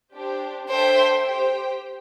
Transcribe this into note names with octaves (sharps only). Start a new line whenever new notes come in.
D4 G4 C5
D4 A4 C5 E5 G5
G4 C5 G5